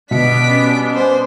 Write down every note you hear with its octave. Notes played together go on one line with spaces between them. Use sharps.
B2 G3 B3 D4 B6 D7
C#4
C5